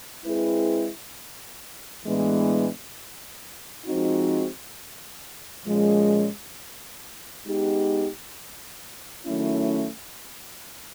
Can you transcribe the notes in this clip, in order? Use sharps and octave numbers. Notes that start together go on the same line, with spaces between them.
G#3 C4 E4 G#4 B4
A2 E3 G#3 B3 D4
F3 G#3 C4 D#4 F#4
A#2 F3 G#3 C#4
G#3 B3 D#4 G4
D#3 F#3 A3 C#4 E4